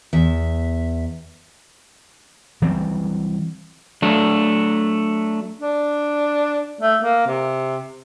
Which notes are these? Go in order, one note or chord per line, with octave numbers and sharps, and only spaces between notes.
E2 E5
E3 F#3 G3 C4
F#3 A3 D4
D4
A3
A#3
C3